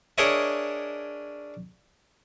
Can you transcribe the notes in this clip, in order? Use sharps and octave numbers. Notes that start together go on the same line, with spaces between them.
D4 G#4 A#4 C#5 D#5 E5